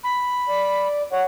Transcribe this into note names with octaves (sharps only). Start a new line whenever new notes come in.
B5
D5
C#5 F#5